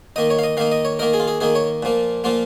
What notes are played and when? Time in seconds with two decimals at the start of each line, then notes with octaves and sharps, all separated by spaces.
0.16 D#3 A#3 D#4 D#5
0.30 C#5
0.39 F5
0.43 D#5
0.57 D#3 A#3 D#4 F5
0.72 D#5
0.85 C#5
0.99 D#3 A#3 D#4 A#4
1.14 G#4
1.20 F4
1.28 G#4
1.41 D#3 A#3 D#4 G#4
1.55 C#5
1.83 A#2 F3 A#3
2.24 A#2 F3 A#3 F4